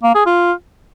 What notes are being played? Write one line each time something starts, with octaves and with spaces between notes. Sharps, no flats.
A#3
G#4
F4